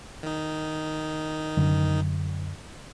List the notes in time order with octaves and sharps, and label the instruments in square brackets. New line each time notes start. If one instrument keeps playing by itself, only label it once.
[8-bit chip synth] D#3 D#4
[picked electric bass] F#2 D3 F#3